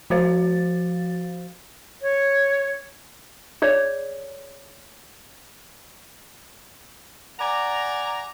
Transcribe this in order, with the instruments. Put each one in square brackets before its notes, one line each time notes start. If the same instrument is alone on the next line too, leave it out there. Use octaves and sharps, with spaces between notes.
[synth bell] F3 F#4 C5 F5 A6
[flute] C#5
[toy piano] G#4 C#5 D5
[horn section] D5 F#5 G#5 A#5